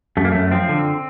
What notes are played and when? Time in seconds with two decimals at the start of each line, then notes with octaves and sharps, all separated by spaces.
0.17 F#2 A3
0.25 A#3
0.32 F#2 A3
0.51 F3 C4
0.69 D3